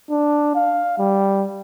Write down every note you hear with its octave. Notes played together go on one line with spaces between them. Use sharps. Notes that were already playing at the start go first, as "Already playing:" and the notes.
D4
F5
G3